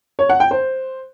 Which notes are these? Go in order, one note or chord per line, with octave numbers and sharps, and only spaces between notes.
C#5
F#5
G5
C5